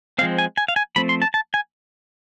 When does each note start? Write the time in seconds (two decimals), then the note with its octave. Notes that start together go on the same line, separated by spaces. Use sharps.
0.18 F3 G#3 C4 F5
0.38 G#5
0.57 G#5
0.68 F5
0.76 G#5
0.96 F3 A3 C4 B5
1.09 C6
1.22 A5
1.34 A5
1.54 G#5